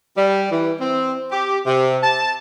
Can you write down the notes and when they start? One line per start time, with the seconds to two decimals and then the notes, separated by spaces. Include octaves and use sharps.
0.17 G3
0.51 E3
0.81 C4
1.32 G4
1.66 C3
2.03 A5